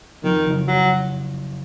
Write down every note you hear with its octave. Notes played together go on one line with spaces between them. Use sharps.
F2 D#3
F#1
F#3